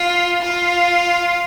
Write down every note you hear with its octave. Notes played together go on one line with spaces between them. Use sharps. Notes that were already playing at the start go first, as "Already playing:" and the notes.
Already playing: F4
F4